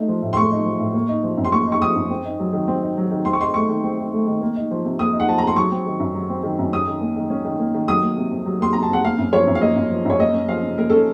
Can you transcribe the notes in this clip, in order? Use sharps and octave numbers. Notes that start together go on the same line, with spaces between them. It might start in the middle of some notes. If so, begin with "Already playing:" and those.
Already playing: A3 D#4
F3
A2
C6
A3 C#6
D#4
F3
A2
A#3
D#4
F3
F#2
C6
A#3 C#6
D#4 C#6
F3 D#6
F#2
C4
D#4
F#3
D#3
C4
D#4
F#3
D#3
C4 C6
C#6
D#4 C6
A3 C#6
D#3
C4
D#4
A3
D#3
A#3
D#4
F3
C3
A#3 D#6
D#4
F#5
F3 A5
A#5
C3 C6
F#3 C#6
C4
D#3
F#2
F#3
C4
D#3
F#2
C#4 D#6
D#3
A#3
D#3
C#4
D#3
A#3
D#3
F#3 D#6
A#3
C3
F2
F#3
A#3 C6
C3 A#5
A5
F2 F#5
A#3 F5
F#2
F3 C#5
F#2
F5
A#3 D#5
F#2
F3
F#2 C#5
A#3 D#5
C#4
F3 F5
C#3
A#3 A#4
C#4 A4